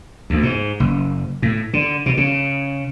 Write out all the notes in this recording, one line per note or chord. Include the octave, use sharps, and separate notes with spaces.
D2
G#2
F#1
A2
D3
B2
C#3